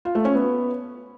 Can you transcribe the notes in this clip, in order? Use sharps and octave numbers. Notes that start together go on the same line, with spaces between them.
F4
A3
C#4
B3